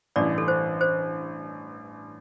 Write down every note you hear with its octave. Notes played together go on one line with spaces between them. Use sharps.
A1 G2 E3 D5
A4
C5
C5